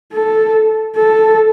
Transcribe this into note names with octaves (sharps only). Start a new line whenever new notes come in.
A4
A4